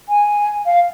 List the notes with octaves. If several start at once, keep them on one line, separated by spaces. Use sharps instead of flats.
G#5
F5